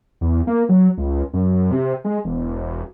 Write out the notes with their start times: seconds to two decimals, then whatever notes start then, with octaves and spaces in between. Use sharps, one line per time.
0.21 E2
0.47 A#3
0.69 F#3
0.97 C#2
1.33 F#2
1.71 C3
2.05 G#3
2.25 E1